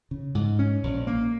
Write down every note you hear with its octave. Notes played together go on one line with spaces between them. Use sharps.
C#3
G#2
C#4
A#1
A#3